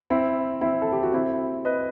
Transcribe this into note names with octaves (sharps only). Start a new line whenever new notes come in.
C4 E4
C4 E4
A4
G4
F#4
C4 E4
B4 D#5